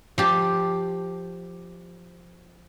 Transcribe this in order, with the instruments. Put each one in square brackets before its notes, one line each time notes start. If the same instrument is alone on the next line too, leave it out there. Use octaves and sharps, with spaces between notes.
[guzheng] F3 G4